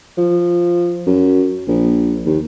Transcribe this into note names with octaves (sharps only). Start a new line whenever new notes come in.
F3
F#2
A#1
D#2